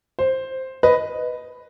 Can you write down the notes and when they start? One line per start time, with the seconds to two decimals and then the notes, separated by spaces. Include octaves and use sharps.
0.19 C5
0.83 B4 D#5